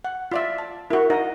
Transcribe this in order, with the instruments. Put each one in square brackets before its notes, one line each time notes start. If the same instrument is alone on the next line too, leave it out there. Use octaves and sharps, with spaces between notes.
[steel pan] F#5
F4 D5 E5
A5
[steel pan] E4 F#4 [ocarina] A#4
[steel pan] D#4 A#4 D#5 [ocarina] F#5